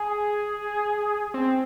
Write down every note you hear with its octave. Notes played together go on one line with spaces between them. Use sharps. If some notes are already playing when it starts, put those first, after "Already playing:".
Already playing: G#4
C4